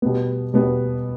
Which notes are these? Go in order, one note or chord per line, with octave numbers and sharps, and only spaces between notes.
B2 G3 B3
B2 G3 B3